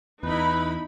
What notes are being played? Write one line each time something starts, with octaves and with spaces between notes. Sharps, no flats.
E2 D#4 E4 B4 B5